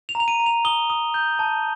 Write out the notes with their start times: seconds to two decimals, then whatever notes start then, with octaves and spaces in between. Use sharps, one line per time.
0.09 F7
0.15 A#5
0.20 F7
0.28 D#7
0.40 A#5
0.46 F7
0.65 D#6 G7
0.90 D#6
1.14 G6
1.39 A5